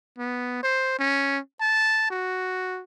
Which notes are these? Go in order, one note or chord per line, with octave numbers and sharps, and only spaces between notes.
B3
C5
C#4
A5
F#4